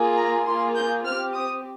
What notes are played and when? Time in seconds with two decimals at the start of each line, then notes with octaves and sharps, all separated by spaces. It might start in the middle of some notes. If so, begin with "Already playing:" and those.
Already playing: A#3 F4 G#4
0.16 A#5
0.45 A#3 F4 G#4 C6
0.75 G6
1.05 C4 G4 F6
1.34 D#6